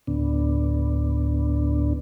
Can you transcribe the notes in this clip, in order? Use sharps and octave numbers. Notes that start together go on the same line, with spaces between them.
D2 A2 D3 B3 D4